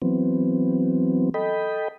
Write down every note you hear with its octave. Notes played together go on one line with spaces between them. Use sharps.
E3 F#3 B3 C4
A4 D#5 G5 B5